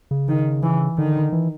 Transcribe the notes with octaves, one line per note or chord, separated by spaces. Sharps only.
C#3
D#3
E3
D3 D#3
E3